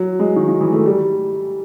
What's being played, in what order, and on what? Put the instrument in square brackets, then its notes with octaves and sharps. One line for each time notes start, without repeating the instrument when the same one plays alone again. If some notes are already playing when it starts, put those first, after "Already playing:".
Already playing: [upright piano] F#3
G#3
D#3
D#3
E3
A3
G3